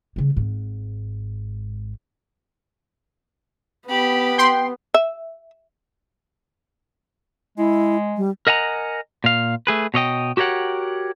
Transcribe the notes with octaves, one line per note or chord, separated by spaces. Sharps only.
C#3 G3
G#1 G#2
B3 G4 B5
G5 C6
E5
G#3 E4
G3
A#4 D#5 F#5 G#5 A#5
A#2 F5
A3 G#4 B4
B2 C#5 D#5 G5
F#4 G4 A#4 C#5 F#5 G5